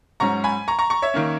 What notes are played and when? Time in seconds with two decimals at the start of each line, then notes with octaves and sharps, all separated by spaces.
0.20 G#2 F#3 C#4 A#5 C#6
0.44 G#5 B5
0.68 A#5 C#6
0.79 A#5 C#6
0.90 A#5 C#6
1.02 C#5 E5
1.14 D#3 A#3 C#4